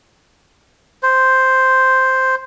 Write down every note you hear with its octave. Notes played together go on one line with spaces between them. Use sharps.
C5